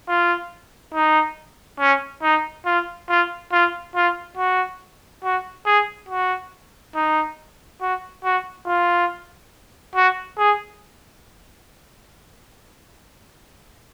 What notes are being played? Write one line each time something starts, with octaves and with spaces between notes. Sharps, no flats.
F4
D#4
C#4
D#4
F4
F4
F4
F4
F#4
F#4
G#4
F#4
D#4
F#4
F#4
F4
F#4
G#4